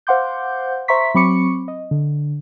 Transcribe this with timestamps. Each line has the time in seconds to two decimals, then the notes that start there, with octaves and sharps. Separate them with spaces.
0.07 C5 F5 F#5 C6 D6 G6
0.88 C5 E5 A#5 C6 C#6 B6
1.14 F#3 C4 B5 C#6 D6 C#7
1.68 D#5
1.91 D3